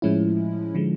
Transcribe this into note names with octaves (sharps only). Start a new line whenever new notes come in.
A2 F3 G#3 C#4 E4
D3 F3 G#3